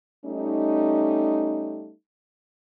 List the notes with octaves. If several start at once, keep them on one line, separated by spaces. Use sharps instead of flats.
G3 A3 C#4 D#4